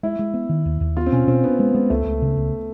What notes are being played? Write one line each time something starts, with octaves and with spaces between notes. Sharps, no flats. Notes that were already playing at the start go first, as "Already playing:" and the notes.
G#3 E4
G#3
B3
D#3
D#2
D#2
B3 F4
C4
B2 C#4
B2 C4
B3 D4
G#3 B3
G#3 B3
C#2 A3
C#2
C#3
C#2